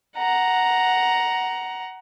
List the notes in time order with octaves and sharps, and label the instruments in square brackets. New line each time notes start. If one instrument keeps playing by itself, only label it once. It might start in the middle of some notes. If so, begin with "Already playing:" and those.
[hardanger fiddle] F#5 A#5